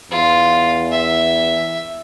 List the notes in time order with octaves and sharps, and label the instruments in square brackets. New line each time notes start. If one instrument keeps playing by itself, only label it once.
[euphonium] E2 [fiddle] F4
[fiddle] E5